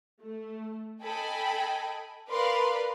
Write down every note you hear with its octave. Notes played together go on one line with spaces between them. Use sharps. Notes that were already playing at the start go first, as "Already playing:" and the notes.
A3
A4 D#5 G5 G#5 B5
A#4 B4 D5 F5 B5 C6